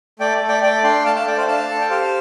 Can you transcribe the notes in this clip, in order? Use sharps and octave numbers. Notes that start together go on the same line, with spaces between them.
A3 D5 G5
A3
D5 G5
A3 D5 G5
D4 G5 C6
A3 F5 A5
F5 A5
A3 D5 G5
C5 F5
D4 F5 A5
A4
G5
G4 C5 F5